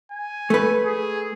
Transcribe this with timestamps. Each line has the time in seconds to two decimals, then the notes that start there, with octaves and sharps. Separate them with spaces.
0.11 G#5
0.50 A3 B4
0.85 G#4